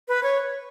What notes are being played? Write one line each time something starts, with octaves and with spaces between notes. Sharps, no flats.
B4
C#5